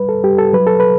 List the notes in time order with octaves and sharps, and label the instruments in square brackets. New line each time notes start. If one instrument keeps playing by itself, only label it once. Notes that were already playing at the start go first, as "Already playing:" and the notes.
Already playing: [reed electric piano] G3 B4
A4
G3 G4
A4
F#3 B4
A4
B4